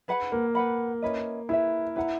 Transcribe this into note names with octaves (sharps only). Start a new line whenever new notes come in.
G#4 B4 F#5 B5
A#3
B4 F#5 B5
C#4 E4 B4 D#5
E4 G#4 B4 E5
E4 B4 F#5 A#5